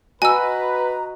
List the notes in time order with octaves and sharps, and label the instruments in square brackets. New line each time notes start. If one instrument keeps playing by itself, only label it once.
[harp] F#4 D#5 [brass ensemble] B4 [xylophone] G#5 E6 [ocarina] A#5